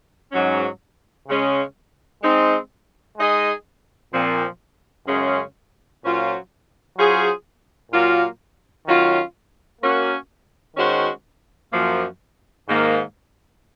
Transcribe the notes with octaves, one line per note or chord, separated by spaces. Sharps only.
G#2 F#3 C#4
C#3 G#3 C#4
G#3 C4 D#4
G#3 D#4 G#4 D#5
A#2 F3 C4
F#2 C#3 G#3 C#4
A#2 F#3 C#4 F4 C5
F#3 C#4 F4 G#4 C5
A#2 F#3 A#3 F4
D#3 F#3 C#4 F4
A#3 C#4 F#4
D#3 G#3 C#4 F#4 C5
F#2 F3 A#3
G#2 D#3 A#3